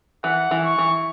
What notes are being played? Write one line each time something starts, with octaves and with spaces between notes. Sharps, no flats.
E3 F#5
E3
C#6
E3